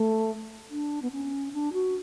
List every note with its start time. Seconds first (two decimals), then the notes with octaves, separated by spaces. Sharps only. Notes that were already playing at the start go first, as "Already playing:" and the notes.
Already playing: A3
0.70 D4
1.02 B3
1.12 C#4
1.53 D4
1.73 F#4